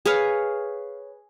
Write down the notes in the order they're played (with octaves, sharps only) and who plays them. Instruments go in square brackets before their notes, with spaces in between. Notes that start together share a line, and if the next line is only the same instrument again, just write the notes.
[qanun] G#4 B4 C#5 F5